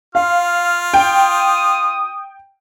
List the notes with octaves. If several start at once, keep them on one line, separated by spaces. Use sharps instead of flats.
F4 F5 F6
G5 D#6